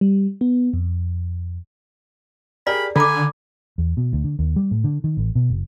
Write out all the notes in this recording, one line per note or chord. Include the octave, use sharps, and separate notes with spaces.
G3
B3
F2
G4 G#4 A#4 D5 B5
D3 A4 G#5 A#5 B5 D6
E2
B2
D2
D3
D#2
G3
A2
D3
D#3
A1
B2
F#1